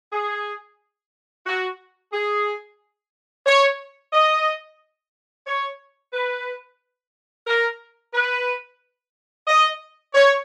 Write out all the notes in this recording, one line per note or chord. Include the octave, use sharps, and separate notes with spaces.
G#4
F#4
G#4
C#5
D#5
C#5
B4
A#4
B4
D#5
C#5